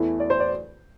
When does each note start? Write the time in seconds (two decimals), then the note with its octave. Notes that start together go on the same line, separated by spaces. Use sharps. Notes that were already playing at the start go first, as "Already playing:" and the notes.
Already playing: E2 E3 A3
0.20 D5
0.30 C5
0.40 D5